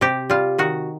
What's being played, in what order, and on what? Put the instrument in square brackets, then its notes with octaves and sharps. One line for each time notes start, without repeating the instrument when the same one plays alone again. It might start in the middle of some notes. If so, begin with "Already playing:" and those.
[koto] C3 G4
G3 F4
D#3 F#4